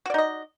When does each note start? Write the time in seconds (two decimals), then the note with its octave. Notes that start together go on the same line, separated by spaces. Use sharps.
0.06 F#4
0.10 D5
0.14 D#4
0.18 D#5